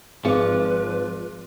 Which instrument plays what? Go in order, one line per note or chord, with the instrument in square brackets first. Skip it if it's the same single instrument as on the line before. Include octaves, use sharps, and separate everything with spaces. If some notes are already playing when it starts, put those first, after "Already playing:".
[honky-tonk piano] G#1 [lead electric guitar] F3 [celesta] G#4 D6 [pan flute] B4